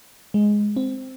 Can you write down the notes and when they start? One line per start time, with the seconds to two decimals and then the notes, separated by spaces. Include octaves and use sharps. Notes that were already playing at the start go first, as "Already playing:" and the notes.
0.34 G#3
0.76 C4